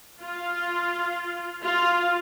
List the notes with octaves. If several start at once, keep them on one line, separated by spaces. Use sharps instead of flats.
F4
F4